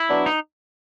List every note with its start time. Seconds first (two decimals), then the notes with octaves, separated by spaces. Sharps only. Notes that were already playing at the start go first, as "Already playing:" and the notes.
Already playing: E4
0.09 F#3 B3 D4
0.26 D#4